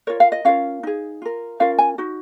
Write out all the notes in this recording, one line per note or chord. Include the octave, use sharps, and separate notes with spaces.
F4 A#4 C#5
F5
D#5
C#4 F4 A#4 F5
D#4 G#4
F4 A#4
C#4 F4 A#4 F5
G#5
D#4 F#4